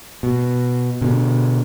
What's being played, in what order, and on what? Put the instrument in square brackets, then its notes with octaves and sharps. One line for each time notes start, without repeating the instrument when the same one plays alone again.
[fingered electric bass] B2
B2 D3